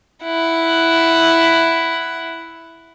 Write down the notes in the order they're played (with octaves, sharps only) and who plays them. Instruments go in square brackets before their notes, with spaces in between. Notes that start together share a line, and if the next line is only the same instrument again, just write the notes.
[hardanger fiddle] E4 F#5